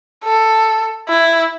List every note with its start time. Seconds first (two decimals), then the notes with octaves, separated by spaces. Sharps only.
0.24 A4
1.09 E4